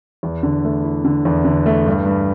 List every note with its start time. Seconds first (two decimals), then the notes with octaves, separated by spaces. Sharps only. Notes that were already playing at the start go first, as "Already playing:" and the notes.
0.23 E2
0.43 D3
0.64 A3
0.84 E4
1.05 D3
1.25 E2
1.45 D3
1.66 A3
1.86 G2
2.06 G2